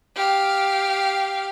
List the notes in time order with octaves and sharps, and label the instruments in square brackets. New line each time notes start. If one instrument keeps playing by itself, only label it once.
[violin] G4 F5